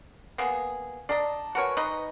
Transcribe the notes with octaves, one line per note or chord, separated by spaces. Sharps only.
A#3 B3 G#4
D4 D5 D#5 A5 A#5
F#4 A#4 B4 C#5 G#5 C#6
D#4 B4 C5 D#5